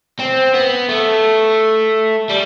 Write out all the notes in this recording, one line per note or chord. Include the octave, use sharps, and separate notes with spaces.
C4
B3
A3
G3